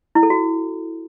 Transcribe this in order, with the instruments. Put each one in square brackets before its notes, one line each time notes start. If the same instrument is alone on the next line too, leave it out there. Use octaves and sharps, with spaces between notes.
[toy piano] E4
A4
F#4